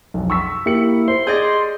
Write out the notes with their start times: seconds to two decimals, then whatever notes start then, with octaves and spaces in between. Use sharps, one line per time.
0.14 B1 F2
0.30 C#6 E6 B6
0.66 A#3 E4 G4 C#7 F#7
1.08 C5 C6
1.27 G#4 D5 D#5 G6 A6